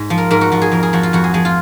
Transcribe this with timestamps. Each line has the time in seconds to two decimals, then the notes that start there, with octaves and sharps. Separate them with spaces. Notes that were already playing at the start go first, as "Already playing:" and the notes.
Already playing: G#2
0.10 F3
0.18 A#4
0.31 G#2 A#4
0.41 F#4
0.52 F3 F#4
0.62 G#4
0.72 F2 A#4
0.83 G#4
0.93 F3 F#4
1.03 F4
1.13 F2 F#4
1.24 G#4
1.34 F3 G#4
1.45 F4